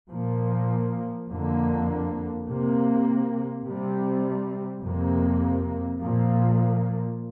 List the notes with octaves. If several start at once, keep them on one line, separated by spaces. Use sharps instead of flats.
A#2 F3 A#3
F2 D3 A#3
C3 A#3
C3 G3 C4
F2 C3 A#3
A#2 F3 A#3